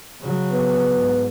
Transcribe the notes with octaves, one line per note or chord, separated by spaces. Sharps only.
C#3 F#3
B3
G#2